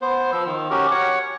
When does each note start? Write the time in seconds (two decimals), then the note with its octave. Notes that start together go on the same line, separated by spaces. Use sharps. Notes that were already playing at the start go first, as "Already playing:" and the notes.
0.02 B3 C5
0.32 F3 E6
0.46 D#3
0.71 C#4 F#4 G4 A#4
0.92 C#5 F#5